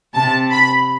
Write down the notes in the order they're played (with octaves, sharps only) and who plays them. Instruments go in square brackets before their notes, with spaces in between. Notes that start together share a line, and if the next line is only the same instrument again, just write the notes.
[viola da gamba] C3 [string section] A5
[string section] B5